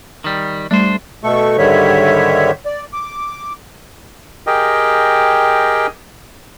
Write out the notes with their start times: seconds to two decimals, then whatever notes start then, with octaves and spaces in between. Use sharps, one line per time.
0.24 D#3 G3
0.71 G3 A3 D4 C5
1.24 B2 A3 A4 C#6
1.58 G#2 D3 D#3 G3 C#5 E5
2.65 D5
2.93 D6
4.47 G4 G#4 A#4 D#5 G5